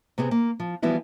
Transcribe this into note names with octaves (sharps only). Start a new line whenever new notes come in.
C3 B3 C4 G4 G#4
A#3
F3
E3 F3 G3 B3 E4 F#4